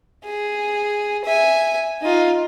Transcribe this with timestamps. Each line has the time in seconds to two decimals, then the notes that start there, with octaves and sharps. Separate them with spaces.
0.25 G#4
1.25 E5 G#5
2.03 D#4 F4